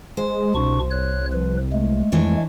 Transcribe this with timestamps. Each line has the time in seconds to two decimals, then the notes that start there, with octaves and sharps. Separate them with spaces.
0.17 G#3 C5
0.55 C2 B2 D4 C#6
0.90 C#5 F#6
1.32 F3 B4
1.73 G#3 A3
2.12 F2 E3 D4 C#5